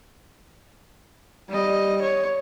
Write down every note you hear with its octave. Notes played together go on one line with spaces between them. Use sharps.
G3 D#5
C#5